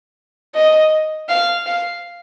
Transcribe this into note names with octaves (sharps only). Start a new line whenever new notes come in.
D#5
F5
F5